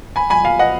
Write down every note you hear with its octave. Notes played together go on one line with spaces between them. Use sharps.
G#5 B5
G#5 B5
F5 G#5
D#5 F#5